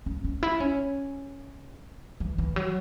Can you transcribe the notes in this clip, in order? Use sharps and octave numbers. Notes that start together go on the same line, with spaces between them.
C#4
C#4
E4
C#4
E3
E3
F#3